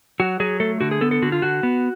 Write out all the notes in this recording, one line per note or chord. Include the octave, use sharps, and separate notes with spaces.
F#3 F#4
F#3 G#4
A3 A4
D3 F#4
G#4
B3 A4
A4
D3 F#4
F4
D3 F#4
B3